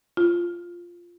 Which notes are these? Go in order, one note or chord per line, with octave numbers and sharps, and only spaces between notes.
F4